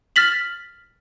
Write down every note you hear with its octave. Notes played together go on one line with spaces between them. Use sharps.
F6 A6 B6 F#7